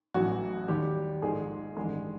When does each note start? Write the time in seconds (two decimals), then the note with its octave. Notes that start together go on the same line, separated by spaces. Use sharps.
0.14 A1 A2 E3 F#3 F#4
0.68 D#2 D#3 G3 G4
1.22 A#1 G#2 D#3 G#3 G#4
1.76 A1 G2 D#3 G#3 G#4